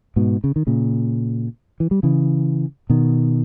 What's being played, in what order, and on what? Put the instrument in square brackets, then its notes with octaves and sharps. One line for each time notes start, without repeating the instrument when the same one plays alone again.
[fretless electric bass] G#2 B2
C#3
D#3
A#2 C#3
E3
G3
C#3 E3
B2 D#3